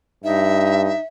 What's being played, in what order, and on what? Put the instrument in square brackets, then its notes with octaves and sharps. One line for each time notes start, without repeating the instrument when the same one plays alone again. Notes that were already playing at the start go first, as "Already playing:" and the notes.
[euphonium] G2 [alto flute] D#4 [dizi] E5